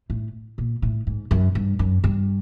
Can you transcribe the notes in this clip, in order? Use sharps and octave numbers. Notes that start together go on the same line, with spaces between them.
A2
A#2
A2
G#2
F#2
G2
F#2
G2